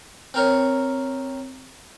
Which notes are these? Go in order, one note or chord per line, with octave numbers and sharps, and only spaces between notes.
C4 A#4 C#5